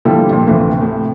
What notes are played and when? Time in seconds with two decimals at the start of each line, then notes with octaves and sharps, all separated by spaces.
0.05 D3 F3 G3 A#3 E4 A4
0.30 F2 A#2
0.47 D2 A2 C3 E3 F3
0.81 A2 C3